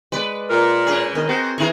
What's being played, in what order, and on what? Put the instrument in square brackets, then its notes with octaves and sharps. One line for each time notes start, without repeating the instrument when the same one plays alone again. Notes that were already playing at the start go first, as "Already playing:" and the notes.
[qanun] G#3 D5 [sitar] B4
[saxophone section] A#2 [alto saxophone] A#4
[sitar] B2 C#4 G#4
[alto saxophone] D#3 [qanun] A#4 D#5
[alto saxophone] C4 [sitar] F#4 [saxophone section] G#4 C5
[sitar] D#3 G#4 A#4 [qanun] E3 A#5 C#6